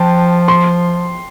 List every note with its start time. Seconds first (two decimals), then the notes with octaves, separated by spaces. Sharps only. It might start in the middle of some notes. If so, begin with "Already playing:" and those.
Already playing: F3 G5 A5
0.48 C6